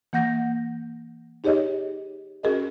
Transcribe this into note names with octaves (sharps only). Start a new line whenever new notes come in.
E3 A#3 F#5 G6 A#6
D#4 G4 G#4 C#5 D#5
C#4 F#4 G#4 A#4 D#5